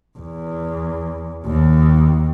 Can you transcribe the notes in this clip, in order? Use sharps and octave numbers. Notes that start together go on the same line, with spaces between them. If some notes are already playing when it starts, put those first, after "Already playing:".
E2
D#2